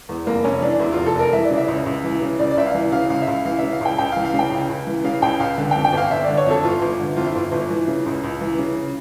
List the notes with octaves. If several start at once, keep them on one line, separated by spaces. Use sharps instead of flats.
E2
F1 A#3
F1 C#4
E3 D4
E2 E4
F1 F4
A4
F1 A#4
E3 E5
D5
C#3
E5
C#2
C#2
E3
C#3
C#2 D5
D5
C#2 E5
F5
E3
C#3 F5
C#2 F5
E5
C#2 F5
E3 F5
C#3 E5
F5
C#2 G5
C#2 G5
F5
E3
F5
C#3 G5
C#2
C#2
E3
C#3 F5
C#2 G5
C#2 F5
D3
F2 G5
G5
G1 F5
G1 E5
D3 D5
C#5
F2 A4
G1 F4
G1
D3
F2 F4
E4
G1 F4
G1
E3
C#3
C#2
C#2
E3
C#3